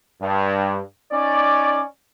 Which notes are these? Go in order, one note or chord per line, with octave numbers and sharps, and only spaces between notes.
G2
C#4 D#4 D5